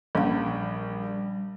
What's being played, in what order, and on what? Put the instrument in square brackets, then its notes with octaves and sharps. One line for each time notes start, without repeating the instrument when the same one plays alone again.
[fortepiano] A#1 [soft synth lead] G3 [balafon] A#3 C#4 F5